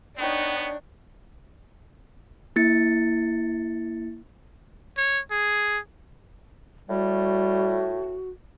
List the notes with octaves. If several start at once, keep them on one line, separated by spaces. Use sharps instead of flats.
B3 D4 D#4 C#5 G5
A#3 E4 A6 C#7
C#5
G#4
A2 G3 F#4